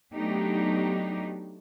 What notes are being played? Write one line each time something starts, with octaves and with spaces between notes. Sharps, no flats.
F#3 A3 B3 D4 D#4 G4